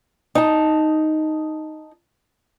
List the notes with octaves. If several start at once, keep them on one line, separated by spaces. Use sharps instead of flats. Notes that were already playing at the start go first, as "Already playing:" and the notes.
D#4 A5